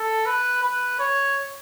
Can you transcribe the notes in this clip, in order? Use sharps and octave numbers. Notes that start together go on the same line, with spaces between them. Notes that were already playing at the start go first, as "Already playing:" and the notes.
Already playing: A4
B4
B4
C#5